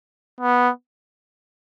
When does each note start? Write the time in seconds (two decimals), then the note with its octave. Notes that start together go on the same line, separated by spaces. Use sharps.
0.41 B3